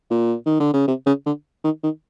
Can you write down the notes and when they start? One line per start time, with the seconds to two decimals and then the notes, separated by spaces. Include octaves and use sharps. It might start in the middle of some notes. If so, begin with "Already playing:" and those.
0.11 A#2
0.46 D#3
0.60 D3
0.74 C#3
0.88 C3
1.06 C#3
1.26 D3
1.64 D#3
1.83 D#3